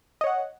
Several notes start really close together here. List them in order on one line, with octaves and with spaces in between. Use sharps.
D#5 C#5 F#5